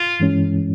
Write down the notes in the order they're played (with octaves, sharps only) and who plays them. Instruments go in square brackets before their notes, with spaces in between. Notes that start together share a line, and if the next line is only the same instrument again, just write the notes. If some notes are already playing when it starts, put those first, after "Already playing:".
Already playing: [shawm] F4
[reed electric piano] G2 E3 G#3 C#4